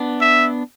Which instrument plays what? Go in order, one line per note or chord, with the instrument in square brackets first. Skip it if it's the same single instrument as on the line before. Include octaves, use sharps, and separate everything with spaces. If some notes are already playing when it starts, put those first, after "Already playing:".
Already playing: [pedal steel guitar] B3 D4
[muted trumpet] E5